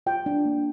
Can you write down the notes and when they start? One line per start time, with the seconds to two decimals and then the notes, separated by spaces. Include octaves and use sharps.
0.06 F4 G5
0.26 D4
0.45 A#3